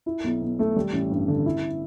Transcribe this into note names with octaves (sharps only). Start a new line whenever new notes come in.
E4
B1
B2
A3
G3
A1
G2
D3
E4